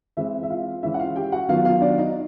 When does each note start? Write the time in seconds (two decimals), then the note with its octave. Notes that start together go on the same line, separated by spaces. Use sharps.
0.17 E3 G#3 C4 E4 E5
0.43 E5
0.50 F4 F5
0.83 E3 G#3 C#4 E4 E5
0.94 F#5
0.99 F4 F5
1.16 G4 G5
1.32 F#4 F#5
1.49 D#3 F#3 B3 F4 F5
1.65 F4 F5
1.82 D4 D5
1.98 D#4 D#5